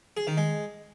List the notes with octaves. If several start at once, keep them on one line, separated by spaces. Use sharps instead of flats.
G#4
D#3
G#3